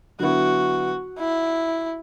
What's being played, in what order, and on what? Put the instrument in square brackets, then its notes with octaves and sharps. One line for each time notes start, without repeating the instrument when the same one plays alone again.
[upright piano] D3 F#3 B3 E4 [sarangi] F#4
[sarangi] E4